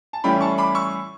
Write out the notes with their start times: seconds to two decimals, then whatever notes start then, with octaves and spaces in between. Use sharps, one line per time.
0.13 A5
0.24 A2 E3 G3 C#4 E4 G5 B5
0.41 A5 C#6
0.58 B5 D6
0.75 C#6 E6